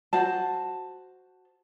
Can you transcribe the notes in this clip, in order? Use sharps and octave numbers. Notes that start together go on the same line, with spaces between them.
F#4 C5 A5